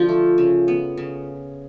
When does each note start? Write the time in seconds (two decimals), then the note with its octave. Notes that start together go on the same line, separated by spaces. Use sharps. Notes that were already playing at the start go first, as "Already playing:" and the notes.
Already playing: D3 F3 F4
0.09 A3
0.38 C#3
0.68 B3
0.97 C#3